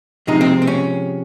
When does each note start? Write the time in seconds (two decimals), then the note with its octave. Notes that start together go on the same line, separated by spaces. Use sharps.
0.27 C3 F3 G#3 D#4
0.41 C4
0.62 C4
0.67 C#4